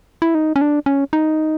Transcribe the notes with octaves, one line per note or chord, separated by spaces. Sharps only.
E4
D#4
C#4
D4
C#4
D#4